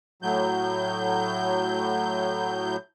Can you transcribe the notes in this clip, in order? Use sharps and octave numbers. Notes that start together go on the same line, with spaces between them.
A2 F#3 G6